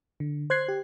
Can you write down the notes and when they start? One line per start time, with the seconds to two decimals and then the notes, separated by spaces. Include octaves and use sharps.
0.20 D3
0.50 C5 F#6 G#6 C7
0.68 G4